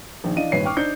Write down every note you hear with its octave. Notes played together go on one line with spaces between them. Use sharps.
A#1 D#3
E3 D4 D#5 F5 D#7
G#1 G2 A#2 B4 C#5 C7
G5 C#6 D6 F6
D4 D#4 C5 G6 C#7